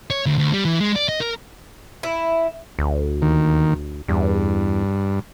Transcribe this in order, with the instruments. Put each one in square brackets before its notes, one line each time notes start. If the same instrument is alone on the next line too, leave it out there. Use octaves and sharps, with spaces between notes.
[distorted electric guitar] C#5
D2
D2
G3
E3
G#3
D5
D#5
A#4
[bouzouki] E4
[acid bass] D2
[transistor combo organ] D#2 D#3
[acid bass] E2 [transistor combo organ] G2